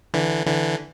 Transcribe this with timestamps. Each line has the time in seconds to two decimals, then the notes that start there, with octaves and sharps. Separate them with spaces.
0.14 D3 E3
0.46 D3 E3